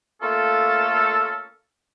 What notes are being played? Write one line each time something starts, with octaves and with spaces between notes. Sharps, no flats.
A3 A#3 C#4 F4 A4